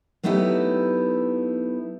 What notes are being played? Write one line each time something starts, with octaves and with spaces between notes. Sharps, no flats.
F#3 A3 B3 D#4 E4 G4